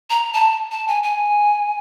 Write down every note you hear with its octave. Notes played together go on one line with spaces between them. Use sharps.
A#5
A5
A5
G#5
G#5